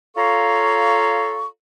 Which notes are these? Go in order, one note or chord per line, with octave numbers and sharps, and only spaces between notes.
F4 A4 C#5 F5 A#5 C#6